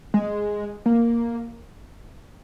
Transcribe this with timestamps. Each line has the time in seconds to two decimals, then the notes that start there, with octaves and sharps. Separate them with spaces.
0.14 G#3
0.86 A#3